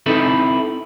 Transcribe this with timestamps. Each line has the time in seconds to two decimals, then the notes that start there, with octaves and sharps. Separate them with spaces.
0.06 C4 D#4 E4 A4 B4